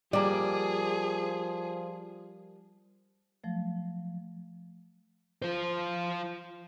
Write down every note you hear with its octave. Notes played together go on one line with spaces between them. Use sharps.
F3 G3 A#3 G#4 D5
F3 F#3 A3
F4 C5